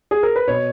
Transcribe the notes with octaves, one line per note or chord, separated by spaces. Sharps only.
G#4
A#4
B4
B2 C#5